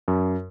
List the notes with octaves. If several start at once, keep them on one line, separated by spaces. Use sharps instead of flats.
F#2